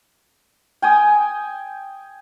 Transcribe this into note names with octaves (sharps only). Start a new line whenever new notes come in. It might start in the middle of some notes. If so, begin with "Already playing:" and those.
G5 G#5 D#6